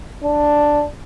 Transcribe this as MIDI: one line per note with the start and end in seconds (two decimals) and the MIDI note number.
0.24 0.85 62